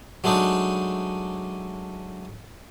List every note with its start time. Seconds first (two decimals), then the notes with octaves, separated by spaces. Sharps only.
0.24 F#3 G#3 A3 D4 D#4